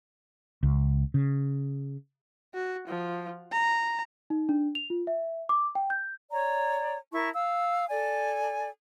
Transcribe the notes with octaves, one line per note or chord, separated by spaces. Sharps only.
C#2
C#3
F#4
F3
A#5
D#4
D4
F7
F4
E5
D6
G5
G6
C#5 D5 A#5
E4 A#4 A5 C#6
F5 E6
A4 D5 G#5